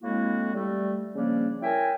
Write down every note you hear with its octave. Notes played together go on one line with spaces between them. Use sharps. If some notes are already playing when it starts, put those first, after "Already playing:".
A2 G#3 A#3 C4 E4 F#4
G3 A3
C#3 F3 G3 A#3 C#4 D4
E4 A#4 C#5 E5 G5 G#5